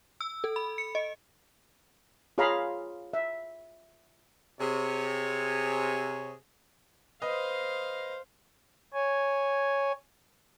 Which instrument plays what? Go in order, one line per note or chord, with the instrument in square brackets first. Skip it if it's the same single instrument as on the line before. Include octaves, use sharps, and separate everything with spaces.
[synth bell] E6
A4
B5
C#7
D#5
[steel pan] F4 G#4 C#5 F5 A#5 B5
E5
[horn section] C3 G#4 C#5
[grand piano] B4 D#5 [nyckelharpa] C5 F5
[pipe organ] C#5 G#5